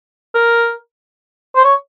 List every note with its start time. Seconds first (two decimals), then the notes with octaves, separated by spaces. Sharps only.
0.35 A#4
1.55 C5
1.64 C#5